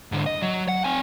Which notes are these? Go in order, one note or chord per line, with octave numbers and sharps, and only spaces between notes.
G#2 D3
D#5
F#3
F#5
C4 G#5